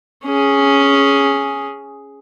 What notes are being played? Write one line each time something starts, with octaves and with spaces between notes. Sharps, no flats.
C#4 G#4